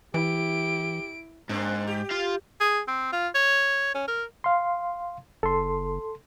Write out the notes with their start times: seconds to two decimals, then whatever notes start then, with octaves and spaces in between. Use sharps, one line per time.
0.14 E3 E4 G4 D7
1.49 G#2 A#3 C4 D4
1.87 G4
2.11 F4 F5
2.60 G#4
2.88 C4
3.12 F4
3.35 C#5
3.94 C#4
4.08 A#4
4.44 F5 C6
5.43 F#1 A4 C6